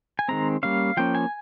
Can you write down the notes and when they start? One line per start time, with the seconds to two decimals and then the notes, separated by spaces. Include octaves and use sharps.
0.19 G#5
0.28 D#3 G#3 C4 A#5
0.63 G3 A#3 C#4 F5
0.97 F3 A#3 C#4 G5
1.15 G#5